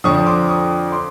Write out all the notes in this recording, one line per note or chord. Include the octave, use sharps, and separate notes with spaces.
F2 D3 F3 C#6 D#6
C6 D6
C#6 D#6
C6 D6